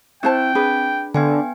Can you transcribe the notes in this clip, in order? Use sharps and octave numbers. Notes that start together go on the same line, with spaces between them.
C4 E4 C5 G5 A5
D4 G#4 B4
D3 B3 G5 G#5